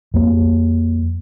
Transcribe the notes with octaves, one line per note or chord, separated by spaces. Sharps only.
F2 A#3